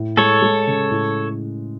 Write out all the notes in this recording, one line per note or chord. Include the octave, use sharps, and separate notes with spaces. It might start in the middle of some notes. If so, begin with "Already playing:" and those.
Already playing: A2
G#3 A4 C#5
G#3
C#3
A2